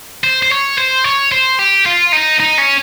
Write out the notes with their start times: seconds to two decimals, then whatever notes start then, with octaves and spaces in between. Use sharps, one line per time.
0.24 C5
0.43 C5
0.52 C#5
0.78 C5
1.04 C#5
1.32 C5
1.59 G4
1.86 F4
2.13 D#4
2.40 D#4
2.58 C#4